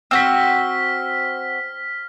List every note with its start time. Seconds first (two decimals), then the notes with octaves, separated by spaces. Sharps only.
0.11 C4 F#4 F6 B6